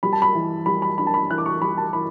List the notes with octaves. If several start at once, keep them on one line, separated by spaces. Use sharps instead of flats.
G3 B5
A5
B5
E3
G3 B5
B5
D4 B5
A5
B5
E3 F#6
D6
C#6
G3 B5
A5
E3 B5